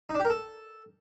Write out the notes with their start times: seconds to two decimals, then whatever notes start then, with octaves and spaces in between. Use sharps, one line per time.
0.09 D#4
0.15 D4
0.20 G4
0.25 A#4
0.30 A4